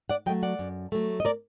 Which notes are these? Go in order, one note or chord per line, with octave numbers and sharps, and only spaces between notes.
D5 F#5
F#3 A3 D#5 G5
D5 F#5
F#2
F#3 A3
D#5
A#4 D5